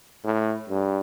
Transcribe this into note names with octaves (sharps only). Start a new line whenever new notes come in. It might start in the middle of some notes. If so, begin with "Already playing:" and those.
A2
G2